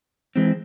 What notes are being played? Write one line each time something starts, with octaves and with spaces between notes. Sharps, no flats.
E3 G#3 C4